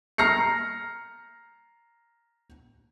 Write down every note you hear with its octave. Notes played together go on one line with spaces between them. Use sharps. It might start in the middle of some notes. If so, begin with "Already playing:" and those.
A#5 F6 A#6 C7 C#7